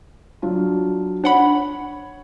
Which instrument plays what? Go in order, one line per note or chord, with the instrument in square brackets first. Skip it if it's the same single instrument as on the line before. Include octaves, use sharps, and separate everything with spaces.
[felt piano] F#3 D4 F4
[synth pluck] D4 F#5 B5 [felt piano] C#5